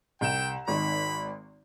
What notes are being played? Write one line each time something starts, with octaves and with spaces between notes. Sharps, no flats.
C2 G5 E7
G#1 D#3 B5